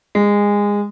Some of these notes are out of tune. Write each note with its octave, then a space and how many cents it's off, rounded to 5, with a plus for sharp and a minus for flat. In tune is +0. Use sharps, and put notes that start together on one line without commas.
G#3 -20